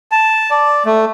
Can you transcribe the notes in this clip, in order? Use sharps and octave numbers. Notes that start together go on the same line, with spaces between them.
A5
D5
A3